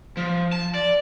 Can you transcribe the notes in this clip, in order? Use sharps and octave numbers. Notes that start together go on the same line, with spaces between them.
F3
A5
D5